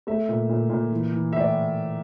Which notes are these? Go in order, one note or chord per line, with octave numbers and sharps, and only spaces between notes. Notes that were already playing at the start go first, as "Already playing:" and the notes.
A3 E5
A#2
A#2
A#2
E3
E3
A2 E5
D5